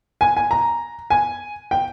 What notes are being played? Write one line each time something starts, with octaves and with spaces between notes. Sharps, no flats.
G#5
G#5
A#5
G#5
G5